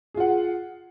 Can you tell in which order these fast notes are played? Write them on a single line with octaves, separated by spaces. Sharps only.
G#4 F4 F#5